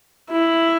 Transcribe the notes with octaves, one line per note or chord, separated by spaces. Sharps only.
E4